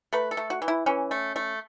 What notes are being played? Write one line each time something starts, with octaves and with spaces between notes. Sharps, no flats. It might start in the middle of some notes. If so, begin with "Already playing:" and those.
A3 B4
A4
A3
F#4
E3
E4
E3 C#4
A3
A3